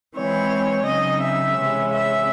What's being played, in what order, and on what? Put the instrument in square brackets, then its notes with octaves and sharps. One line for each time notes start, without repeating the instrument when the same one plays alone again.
[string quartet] E3 G#3 C4 C#5
C#3 F#3 C4 D#4 D#5
E5
C3 E3 G#3 C#4
E5